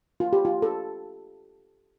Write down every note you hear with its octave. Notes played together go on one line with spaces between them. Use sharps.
F4
G4
F4
A4